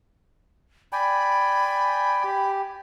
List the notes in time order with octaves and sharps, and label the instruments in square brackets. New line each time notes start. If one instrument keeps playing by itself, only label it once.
[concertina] D5 G5 G#5 [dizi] B5
[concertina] G4